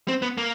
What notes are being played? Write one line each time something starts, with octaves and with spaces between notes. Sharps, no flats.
C4
B3
A#3